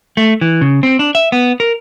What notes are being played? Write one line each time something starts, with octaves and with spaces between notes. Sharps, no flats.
A3
E3
C#3
C4
D4
E5
B3
A#4